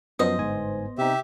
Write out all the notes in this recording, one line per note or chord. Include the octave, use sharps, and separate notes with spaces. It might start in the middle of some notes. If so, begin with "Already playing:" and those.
F#2 F3 F#3 B3 C5 D#5
G1 G#2 G#5
C3 D#4 G4 E5